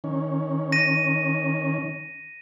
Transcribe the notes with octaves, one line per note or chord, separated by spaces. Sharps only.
D#3 C#4
A#6 D#7